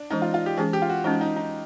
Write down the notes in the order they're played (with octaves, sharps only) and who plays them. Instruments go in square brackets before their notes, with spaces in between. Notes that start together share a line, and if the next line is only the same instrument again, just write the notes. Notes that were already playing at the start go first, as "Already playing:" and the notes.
Already playing: [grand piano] D4
[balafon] E3 G#3 C#4 [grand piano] D#4
[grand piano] F4
F4
G4
[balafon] E3 G#3 C#4 [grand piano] G#4
[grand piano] G4
F4
F#4
[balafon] E3 G#3 C#4 [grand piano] D#4
[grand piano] D#4
D#4